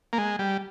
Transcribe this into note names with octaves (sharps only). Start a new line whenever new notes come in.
A#3
G#3
G3